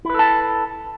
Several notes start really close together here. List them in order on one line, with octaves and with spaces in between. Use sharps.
E4 B4 A4 A5